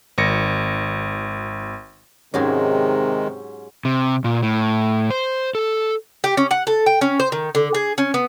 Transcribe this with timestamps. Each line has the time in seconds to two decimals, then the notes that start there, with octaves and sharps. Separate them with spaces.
0.18 G#1 A#6 C#7
2.34 G#2 C3 D#3 F#3 G#3 C#4 G4 G#4
3.85 C3
4.24 A#2
4.42 A2
5.10 C5
5.55 A4
6.24 G4
6.37 C#4
6.51 F#5
6.67 A4
6.86 G5
7.01 C#4
7.20 C5
7.32 D#3
7.55 D3
7.74 G#4
7.98 C#4
8.14 B3